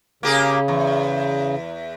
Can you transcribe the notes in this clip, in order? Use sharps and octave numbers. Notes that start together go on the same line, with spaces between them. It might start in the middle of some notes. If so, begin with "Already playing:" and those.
C#3 A#3 G4 G#4
E2